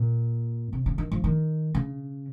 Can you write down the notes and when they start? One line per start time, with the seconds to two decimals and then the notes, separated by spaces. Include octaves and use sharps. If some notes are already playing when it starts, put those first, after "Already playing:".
Already playing: A#2
0.73 C3
0.86 C#3
0.98 D#3
1.11 F3
1.24 D#3
1.75 C#3